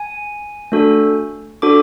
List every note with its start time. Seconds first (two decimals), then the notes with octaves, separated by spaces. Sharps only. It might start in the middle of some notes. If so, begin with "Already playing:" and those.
Already playing: G#5
0.72 A3 D4 F#4 A4
1.62 D4 F#4 A4 D6